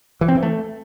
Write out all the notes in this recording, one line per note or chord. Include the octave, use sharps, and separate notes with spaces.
E3
C4
E3
A3